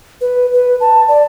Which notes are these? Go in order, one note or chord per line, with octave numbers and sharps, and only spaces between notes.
B4
B4
A5
D5